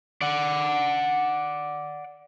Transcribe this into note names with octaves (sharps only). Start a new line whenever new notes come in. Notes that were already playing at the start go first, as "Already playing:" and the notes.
D5 F#5